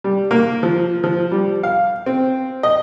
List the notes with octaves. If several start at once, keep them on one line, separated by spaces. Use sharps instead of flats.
G3
A#3
F3
F3
G3
F5
C4
D#5